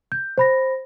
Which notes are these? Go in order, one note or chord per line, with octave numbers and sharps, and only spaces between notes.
G6
C5 B5 A#6